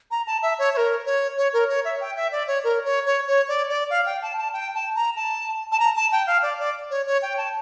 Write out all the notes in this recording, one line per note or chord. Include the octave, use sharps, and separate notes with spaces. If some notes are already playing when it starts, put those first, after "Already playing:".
A#5
A5
E5
C#5
C#5
A#4
C#5
C#5
A#4
C#5
E5
G5
E5
D5
C#5
A#4
C#5
C#5
C#5
D5
D5
F5
G5
A5
A5
G5
A5
A#5
A5
A5
A#5
A5
G5
F5
D5
D5
C#5
C#5
G5
A5